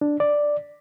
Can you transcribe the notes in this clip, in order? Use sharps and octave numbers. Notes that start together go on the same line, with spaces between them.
D4
D5